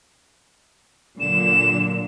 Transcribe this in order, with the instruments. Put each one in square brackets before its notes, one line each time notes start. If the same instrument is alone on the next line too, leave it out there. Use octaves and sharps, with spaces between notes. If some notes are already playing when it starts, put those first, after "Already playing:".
[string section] A#2 D3 F#3 [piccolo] E7